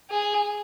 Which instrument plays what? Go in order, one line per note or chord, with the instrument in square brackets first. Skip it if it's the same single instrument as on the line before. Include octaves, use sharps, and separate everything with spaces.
[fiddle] G#4